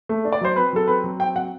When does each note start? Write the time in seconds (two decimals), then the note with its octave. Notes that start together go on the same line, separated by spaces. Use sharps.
0.09 A3
0.25 D4
0.32 D5
0.41 F#3 C5
0.56 C4 B4
0.73 F#3 A4
0.87 C4 B4
1.04 F#3
1.20 C4 G5
1.36 F#3 F#5